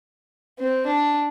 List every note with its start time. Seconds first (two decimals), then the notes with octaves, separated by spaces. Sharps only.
0.59 C4
0.87 D4